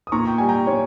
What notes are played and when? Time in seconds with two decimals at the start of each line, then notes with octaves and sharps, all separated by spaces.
0.07 D#6
0.12 A#2 A#5 C#6
0.27 G5
0.38 G3 G#5
0.49 G5 A#5
0.67 A#2 C#5